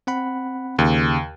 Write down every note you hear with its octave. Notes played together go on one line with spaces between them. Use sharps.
C4 F#5 B5
D#2 C#3